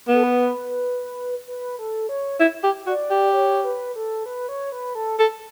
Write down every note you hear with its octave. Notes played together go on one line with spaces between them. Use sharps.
B3 A4
B4
B4
A4
C#5
E4
G4
F#4 D5
G4
C#5
B4
A4
B4
C#5
B4
A4
A4